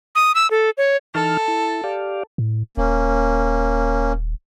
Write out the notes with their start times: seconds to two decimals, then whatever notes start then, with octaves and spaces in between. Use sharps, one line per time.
0.15 D#6
0.35 E6
0.51 A4
0.78 C#5
1.15 E3 D#4 A4 F6
1.48 E4
1.84 G4 D5 F5
2.38 A2
2.77 D#1 A#3 C#4